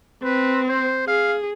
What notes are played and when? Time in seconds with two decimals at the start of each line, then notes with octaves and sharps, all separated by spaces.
0.24 C4 B4
0.69 C5
1.08 G#4 F5